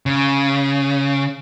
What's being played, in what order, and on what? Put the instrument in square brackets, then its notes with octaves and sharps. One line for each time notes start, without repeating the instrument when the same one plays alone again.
[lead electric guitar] C#3